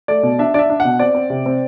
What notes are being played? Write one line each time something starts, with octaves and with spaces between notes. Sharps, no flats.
A3 D5
B2
D4 E5
D4 D5 E5
D4
F#5
B2
C4 D5
C4
C3
C4